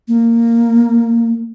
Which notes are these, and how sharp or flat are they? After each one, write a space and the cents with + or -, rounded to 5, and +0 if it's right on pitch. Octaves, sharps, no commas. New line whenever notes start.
A#3 -10